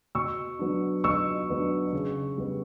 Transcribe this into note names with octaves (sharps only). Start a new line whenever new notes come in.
B2 C#6 E6
F#3 B3 D4
B2 C#6 E6
F#3 B3 D4
C#3
G3 B3